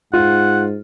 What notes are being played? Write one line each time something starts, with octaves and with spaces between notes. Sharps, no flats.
G#2 F4 F#5